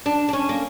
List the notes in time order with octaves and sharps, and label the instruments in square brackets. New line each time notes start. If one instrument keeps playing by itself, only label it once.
[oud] D4
D4
C#4
A#3